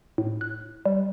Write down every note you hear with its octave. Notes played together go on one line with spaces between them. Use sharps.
A2
F#6
G3